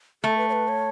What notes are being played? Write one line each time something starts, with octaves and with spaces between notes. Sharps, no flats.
A3 A4
B4
C#5
B4
C#5